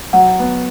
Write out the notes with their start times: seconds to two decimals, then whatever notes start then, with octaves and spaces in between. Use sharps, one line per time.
0.13 F#3 F#5
0.39 B3